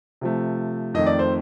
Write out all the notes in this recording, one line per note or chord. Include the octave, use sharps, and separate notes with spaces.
C3 F3 A3
F2 D#3 A3 D#5
D5
C5